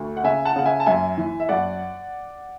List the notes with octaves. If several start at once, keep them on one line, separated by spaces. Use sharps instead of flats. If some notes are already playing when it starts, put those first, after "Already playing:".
Already playing: D2
F#5
C#3 E5 G#5
F#5 A5
C#3 F#5
E5 G#5
A5
F#2 E5 G#5
E3
E5
F#2 D5 F#5